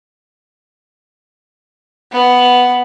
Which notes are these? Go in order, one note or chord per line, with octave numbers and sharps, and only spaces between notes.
B3